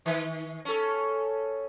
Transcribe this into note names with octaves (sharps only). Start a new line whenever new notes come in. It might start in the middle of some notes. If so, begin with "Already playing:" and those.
D#3
C#4 A4